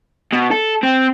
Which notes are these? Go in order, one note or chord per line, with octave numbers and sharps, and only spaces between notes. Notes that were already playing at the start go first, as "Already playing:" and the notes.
B2
A4
C4